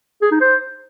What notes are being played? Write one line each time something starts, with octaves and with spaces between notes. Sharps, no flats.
G#4
D#4
C5